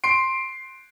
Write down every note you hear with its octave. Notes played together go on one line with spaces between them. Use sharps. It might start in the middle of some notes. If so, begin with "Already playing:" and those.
C6 C7 D7